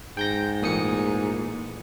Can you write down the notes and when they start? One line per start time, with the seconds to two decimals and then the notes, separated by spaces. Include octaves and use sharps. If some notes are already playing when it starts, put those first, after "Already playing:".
0.17 G#2 G5 G6 A#6
0.62 A1 A#2 E3 G#4 D#6 C#7